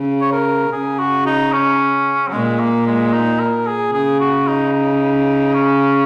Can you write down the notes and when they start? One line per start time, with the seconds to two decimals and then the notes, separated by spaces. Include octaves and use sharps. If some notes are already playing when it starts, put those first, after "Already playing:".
Already playing: C#3
0.21 C#5
0.32 A#4
0.72 C#3 G#4
0.99 F#4
1.26 D#4
1.52 C#4
2.28 F#3
2.33 A#2 G#3
2.60 A#3
2.87 G#3
3.13 D#4
3.40 A#4
3.67 G#4
3.93 C#3 G#4
4.20 F#4
4.47 D#4
4.73 D#4
5.53 C#4